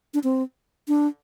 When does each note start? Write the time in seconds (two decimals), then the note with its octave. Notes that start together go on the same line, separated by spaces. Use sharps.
0.14 D4
0.24 C4
0.88 D4